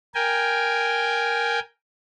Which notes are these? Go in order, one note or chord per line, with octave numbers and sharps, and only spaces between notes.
A#4 G5 G#5